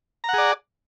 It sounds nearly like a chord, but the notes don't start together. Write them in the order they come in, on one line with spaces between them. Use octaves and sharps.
A#5 F#5 G#4 D5